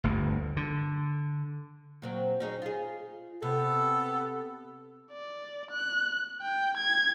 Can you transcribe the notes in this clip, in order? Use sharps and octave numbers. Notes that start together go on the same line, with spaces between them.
G1 D2 G2 D3
D3
A#2 F#3 C4
C#4 D#4 G#4
F4 G#4
C3 B3 A4
D5
F#6
G5
G#6